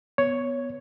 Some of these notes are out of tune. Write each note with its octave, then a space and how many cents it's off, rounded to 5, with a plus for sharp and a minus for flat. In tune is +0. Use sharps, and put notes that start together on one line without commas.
B3 +0 C#5 +5